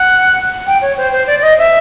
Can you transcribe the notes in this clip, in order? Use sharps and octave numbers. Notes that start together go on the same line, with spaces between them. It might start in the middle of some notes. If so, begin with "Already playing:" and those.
Already playing: F#5
G5
C#5
C5
C5
D5
D5
D#5
E5